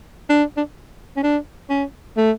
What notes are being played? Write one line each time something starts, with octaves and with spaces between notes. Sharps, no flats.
D4
D4
C#4
D4
C#4
A3